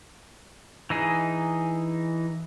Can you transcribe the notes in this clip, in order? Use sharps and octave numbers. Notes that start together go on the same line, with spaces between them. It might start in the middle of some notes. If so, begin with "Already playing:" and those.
E3 D#4 G#4